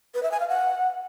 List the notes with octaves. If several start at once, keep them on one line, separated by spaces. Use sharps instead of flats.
B4
E5
G#5
F5
F#5